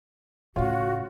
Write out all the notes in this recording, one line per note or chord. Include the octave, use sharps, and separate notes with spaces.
A2 C#3 F4 F#4 C#5 F5